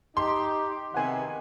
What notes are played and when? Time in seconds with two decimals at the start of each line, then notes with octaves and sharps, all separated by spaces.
0.17 D#4 G4 C6
0.94 C3 D#3 B3 F#5 G#5